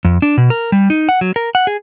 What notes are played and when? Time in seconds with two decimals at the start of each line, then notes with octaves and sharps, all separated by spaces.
0.05 F2
0.22 D4
0.37 B2
0.50 A#4
0.72 G3
0.90 D#4
1.09 F#5
1.21 F#3
1.36 A#4
1.55 F#5
1.67 G#4